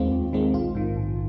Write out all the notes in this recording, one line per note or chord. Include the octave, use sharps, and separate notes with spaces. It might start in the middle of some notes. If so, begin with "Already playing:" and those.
Already playing: D#2 D#3 G#3 C4 F4
D#2
D#3 G#3 C4
A#1 F4
G#2 D#3
A#1